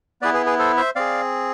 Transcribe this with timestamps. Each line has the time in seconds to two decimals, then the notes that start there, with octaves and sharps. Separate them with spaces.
0.22 B3 E4 G#4 B4 D5
0.34 G#4 B4
0.46 G#4 B4
0.59 A4 C5
0.77 C5 E5
0.96 C4 G#4 D5 F5